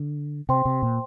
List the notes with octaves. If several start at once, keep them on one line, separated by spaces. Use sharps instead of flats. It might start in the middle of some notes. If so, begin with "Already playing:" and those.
Already playing: D3
C3 C5 G5 C6
C3
A#2